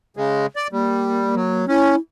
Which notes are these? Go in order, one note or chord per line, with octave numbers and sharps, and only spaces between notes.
C#3 G#3
D5
G3 A#3
F#3
C#4 E4